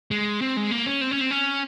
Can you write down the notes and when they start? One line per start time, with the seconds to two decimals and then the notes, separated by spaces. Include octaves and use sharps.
0.11 G#3
0.42 C4
0.57 G#3
0.71 A#3
0.86 C#4
1.01 C4
1.11 C#4
1.21 C4
1.31 C#4